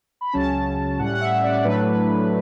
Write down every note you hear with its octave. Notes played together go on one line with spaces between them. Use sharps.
B5
C#2 C#3 F#3 C#4 A5
A2 G3 C#4 F#5
F#5
E5
D5
A2 F#3 A3 D4 B4